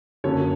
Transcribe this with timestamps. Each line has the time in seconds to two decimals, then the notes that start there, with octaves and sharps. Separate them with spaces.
0.24 F#2 D3 F#3 A#3 C#4 C#5